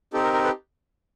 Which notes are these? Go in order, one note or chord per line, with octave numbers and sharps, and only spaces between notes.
C4 D#4 G4 A4
A#4
A#4
A4 B4